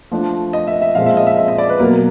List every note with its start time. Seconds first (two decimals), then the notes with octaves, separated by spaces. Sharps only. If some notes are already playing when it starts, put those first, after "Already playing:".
0.11 F3 A3 D4
0.53 D#5
0.67 E5
0.82 E5
0.95 A#2 F3 G#3 C4 F5
1.06 E5
1.17 D#5
1.27 E5
1.37 E5
1.48 D#5
1.58 D5
1.69 B4
1.79 B2 F#3 A#3 A#4